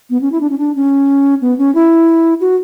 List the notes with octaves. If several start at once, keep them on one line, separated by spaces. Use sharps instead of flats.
B3
C#4
E4
D4
C#4
D4
C#4
B3
C#4
E4
F#4